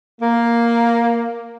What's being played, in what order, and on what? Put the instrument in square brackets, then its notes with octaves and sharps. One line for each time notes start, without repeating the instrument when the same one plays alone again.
[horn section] A#3